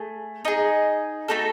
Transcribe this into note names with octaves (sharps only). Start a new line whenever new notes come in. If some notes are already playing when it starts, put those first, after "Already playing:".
Already playing: A3 G#4
D#4 G#4 D#5
A3 D#4 F#4 A4